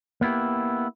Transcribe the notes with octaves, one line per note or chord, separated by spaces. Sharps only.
A#3 B3 E4 G4